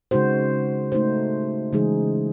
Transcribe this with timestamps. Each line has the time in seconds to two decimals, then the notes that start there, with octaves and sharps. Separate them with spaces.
0.11 C#3 G#3 D#4 F#4 C5
0.92 A3 D#4 F#4 C5
1.73 C#3 E3 G#3 D#4 G#4